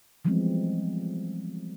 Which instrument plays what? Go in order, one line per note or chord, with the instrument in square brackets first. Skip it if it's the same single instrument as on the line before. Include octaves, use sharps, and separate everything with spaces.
[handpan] E3 F3 G3 G#3 B3 C4